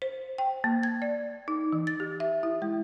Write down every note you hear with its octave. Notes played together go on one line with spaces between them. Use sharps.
C5
G5
A#3
G#6
D5
D#4
E3
A6
G4
E5
E4
G#3